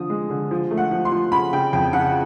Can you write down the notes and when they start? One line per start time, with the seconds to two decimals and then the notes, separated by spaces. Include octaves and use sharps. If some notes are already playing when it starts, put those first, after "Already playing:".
Already playing: D3 F3 D#6
0.10 G#3
0.30 D3
0.51 F3
0.71 A3
0.77 F#5
0.91 F3
1.05 C6
1.12 F3
1.32 C#3 B5
1.53 C#3 G5
1.73 F2 G5
1.93 C#3 F#5